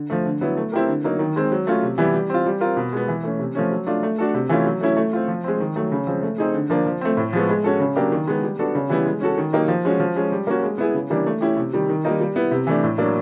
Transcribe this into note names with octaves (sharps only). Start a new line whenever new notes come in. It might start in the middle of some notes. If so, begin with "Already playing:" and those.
Already playing: D3
F3 A3
D3
F#3 B3 E4
A3
C4 E4 G4 A#4
D3
F#3 A#3 D#4
D#3
G#3 C4
F#3
A3 C#4 F4
C3
E3 G3 B3 E4
G3
C4 F4
G3
C4 F4 A#4
B2
G#3 B3
E3
A3 C#4
C3
F3 A3 C#4
F#3
A3 D4 F4
A3
D4 F#4 A4
C3
E3 A3 C#4 F4
F#3
A3 C#4 E4
A3
C4 F4
F3
G#3 C4
D#3
F#3 A3
C#3
F3 G#3 C4
A3
C4 D#4 G#4
D3
F3 A#3 D4
F3
A3 C4
A2
F3 G#3 B3
G#3
C#4 F#4 A4
C#3
F#3 A#3 D4 G4
D#3
G#3 B3
G3
B3 D4 F#4 A4
C#3
E3 G3 B3 E4
G#3
C#4 F#4 A4
D#3
F#3 A#3 D#4 G4
F3
G#3 C#4 F#4
F3
G#3 C#4
G3
A#3 C#4 F#4
G#3
B3 E4 G#4
C#3
E3 G3 A#3 D4
A3
C#4 E4 G4
C3
D#3 G3
D#3
G3 A#3 D#4
G3
B3 E4
C3
E3 A3 D4
A2
F#3 A#3 D4